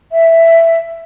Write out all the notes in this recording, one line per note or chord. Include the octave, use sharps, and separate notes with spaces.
E5